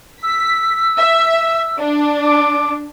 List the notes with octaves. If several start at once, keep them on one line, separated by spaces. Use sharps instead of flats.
E6 B6
E5
D4
D6